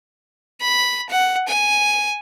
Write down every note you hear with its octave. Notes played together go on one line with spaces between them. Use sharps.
B5
F#5
G#5